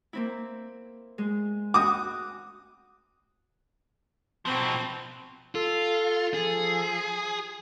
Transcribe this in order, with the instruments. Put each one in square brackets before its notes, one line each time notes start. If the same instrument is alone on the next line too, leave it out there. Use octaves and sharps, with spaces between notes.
[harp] A#3 C4 E4
G#3
[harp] F#4 [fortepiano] D6 D#6
[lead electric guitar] B2 F3 [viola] C4
[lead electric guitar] F4 [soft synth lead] A4
[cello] F3 [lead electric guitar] G#4